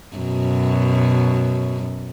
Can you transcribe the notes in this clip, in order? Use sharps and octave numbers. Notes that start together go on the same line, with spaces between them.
F#2 B2